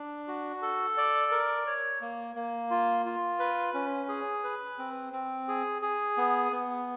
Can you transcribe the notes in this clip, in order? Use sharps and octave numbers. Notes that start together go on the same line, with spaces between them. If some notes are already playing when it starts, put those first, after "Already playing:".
Already playing: D4
F#4
A4
D5
A#4
C#5
A#3
A#3
F4
F4
B4
C#4
G#4
B4
C4
C4
G#4
G#4
B3
B3